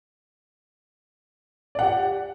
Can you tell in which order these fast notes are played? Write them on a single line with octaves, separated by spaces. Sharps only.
D5 F#5 G4